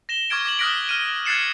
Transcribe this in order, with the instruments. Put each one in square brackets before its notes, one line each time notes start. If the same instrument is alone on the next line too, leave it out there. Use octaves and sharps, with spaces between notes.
[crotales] A#6 E7 G7
C#6 D6 F6 G#6 A6 D7
D6 A#6 F#7
D#6 F6 F#6 A#6 B6 D7
F6 D#7
F#6 G#6 A6 C7 C#7 E7